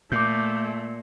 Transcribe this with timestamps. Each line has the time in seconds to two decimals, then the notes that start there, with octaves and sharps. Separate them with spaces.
0.12 A#2 A3 D6 G6